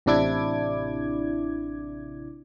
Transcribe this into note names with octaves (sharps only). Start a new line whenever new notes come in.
A1 C3 D4 E4 D6 G#6